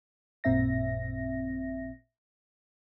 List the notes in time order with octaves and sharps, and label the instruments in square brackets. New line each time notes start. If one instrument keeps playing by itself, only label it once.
[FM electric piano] A1 F#2 A#2 C4 E5 A#6